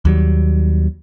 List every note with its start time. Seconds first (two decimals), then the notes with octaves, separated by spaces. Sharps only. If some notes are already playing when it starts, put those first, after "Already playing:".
0.05 D#2 F#3 G3